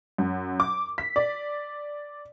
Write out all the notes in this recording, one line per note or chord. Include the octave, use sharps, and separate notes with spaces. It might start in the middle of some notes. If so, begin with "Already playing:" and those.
F#2
D6
B6
D5